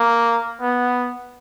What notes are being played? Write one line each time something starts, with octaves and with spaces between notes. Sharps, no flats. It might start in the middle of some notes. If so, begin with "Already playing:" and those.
Already playing: A#3
B3